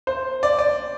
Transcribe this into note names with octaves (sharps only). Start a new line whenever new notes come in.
C5
D5
D5